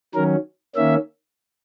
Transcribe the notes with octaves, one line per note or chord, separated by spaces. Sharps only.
D#3 F#3 C#4 A#4
D#3 A#3 C#4 E5